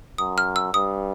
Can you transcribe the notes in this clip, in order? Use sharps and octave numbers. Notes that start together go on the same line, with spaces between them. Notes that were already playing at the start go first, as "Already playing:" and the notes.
F#2 D#6
F6
E6
G2 D#6